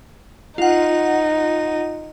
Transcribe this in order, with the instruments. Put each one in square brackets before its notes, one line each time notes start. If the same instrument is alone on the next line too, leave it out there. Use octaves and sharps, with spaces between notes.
[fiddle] D#4 [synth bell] F4 F#5